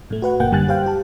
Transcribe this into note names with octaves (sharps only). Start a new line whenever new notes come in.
A2 A3
F#4 B4 F#5
G1 A#2 A#3 F#5 G5
F#2 D3 G3 G#5 F#6 A6
G4 C5 F5 G5
G4 A5